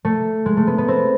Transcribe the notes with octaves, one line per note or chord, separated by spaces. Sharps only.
A3
G#3
A3
B3
B3
C4